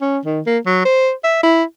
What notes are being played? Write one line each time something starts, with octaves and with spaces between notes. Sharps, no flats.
C#4
D#3
A#3
F#3
C5
E5
E4